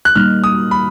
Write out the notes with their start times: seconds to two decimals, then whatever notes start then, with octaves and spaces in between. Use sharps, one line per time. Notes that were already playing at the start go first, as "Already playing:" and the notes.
0.05 F#6
0.15 G3 A#3 D#4 F6
0.44 D#6
0.71 B5